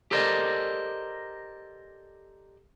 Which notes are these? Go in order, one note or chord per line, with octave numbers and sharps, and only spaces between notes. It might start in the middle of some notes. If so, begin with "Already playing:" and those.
G4 A4 A#4 C5 D5 D#5